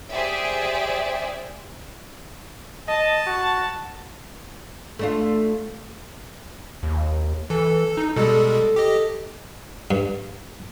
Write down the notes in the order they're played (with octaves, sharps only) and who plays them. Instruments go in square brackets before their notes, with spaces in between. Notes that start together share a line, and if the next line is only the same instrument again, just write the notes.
[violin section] G4 G#4 C5 D5 E5 G#5
[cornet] D#5 [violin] A5
[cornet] F#4
[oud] A3 D4 F4
[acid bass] D#2
[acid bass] E3 [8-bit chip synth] A4
[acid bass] D#4
[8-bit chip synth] B2 G3 G#3 [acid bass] A4
[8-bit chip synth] G4 D#5
[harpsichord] G2